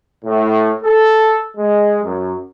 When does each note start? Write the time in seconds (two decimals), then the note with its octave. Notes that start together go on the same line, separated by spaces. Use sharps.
0.25 A2
0.83 A4
1.57 G#3
2.03 F#2